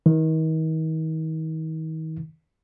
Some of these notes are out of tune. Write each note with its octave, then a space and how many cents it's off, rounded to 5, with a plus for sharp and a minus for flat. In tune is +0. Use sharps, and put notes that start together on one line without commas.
D#3 +40